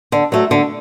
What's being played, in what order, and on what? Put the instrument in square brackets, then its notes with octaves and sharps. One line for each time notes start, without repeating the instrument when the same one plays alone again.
[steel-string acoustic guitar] D3
F#3 A3
D3